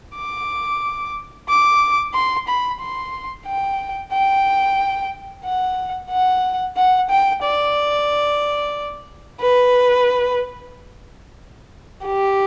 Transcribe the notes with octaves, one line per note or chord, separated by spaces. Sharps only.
D6
D6
C6
B5
C6
G5
G5
F#5
F#5
F#5
G5
D5
B4
G4